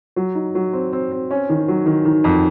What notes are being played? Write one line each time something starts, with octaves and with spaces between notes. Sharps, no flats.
F#3
D#4
F#3
C4
C4
C4
C#4
D#3
F#3
D#3
D#3
F2